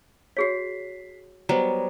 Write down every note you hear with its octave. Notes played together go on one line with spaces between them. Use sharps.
F#4 G#4 C#5 B6 C7
F#3 G3 B3 C5 A#5